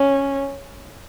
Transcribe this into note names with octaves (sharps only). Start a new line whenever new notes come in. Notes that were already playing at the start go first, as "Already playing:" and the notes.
Already playing: C#4